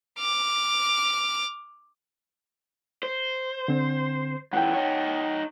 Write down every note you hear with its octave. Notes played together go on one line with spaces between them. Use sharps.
D6 F6
C5
D3 C4
F#2 E3 F#5 G5
D#4 C#5